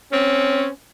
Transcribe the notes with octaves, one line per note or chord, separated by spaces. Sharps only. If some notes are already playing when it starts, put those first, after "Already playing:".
C4 C#4